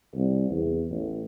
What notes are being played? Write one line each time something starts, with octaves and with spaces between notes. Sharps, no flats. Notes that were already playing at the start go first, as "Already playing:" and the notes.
C2
E2
A1